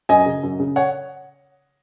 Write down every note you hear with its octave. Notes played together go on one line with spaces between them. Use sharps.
F#2 D#5 G#5
C#3
F#2
C#3
C#5 F#5